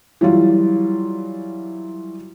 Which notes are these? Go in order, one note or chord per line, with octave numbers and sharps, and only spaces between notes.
E3 F#3 G3 F4